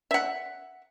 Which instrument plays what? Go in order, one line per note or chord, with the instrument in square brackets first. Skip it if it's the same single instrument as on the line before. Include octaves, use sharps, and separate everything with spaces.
[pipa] E5 F#5